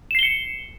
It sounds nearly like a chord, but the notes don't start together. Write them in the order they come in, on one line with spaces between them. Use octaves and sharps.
E7 C7 G7 C#7